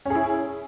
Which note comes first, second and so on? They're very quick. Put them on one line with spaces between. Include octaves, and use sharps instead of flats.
C#4 G#4 E4